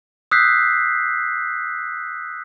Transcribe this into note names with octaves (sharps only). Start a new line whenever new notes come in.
D#6 E6 F#6 G6 B6 C7